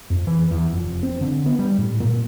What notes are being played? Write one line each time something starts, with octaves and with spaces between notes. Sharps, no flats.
F2
E3
E2
F1
C4
D3
B3
G3
A2
A#2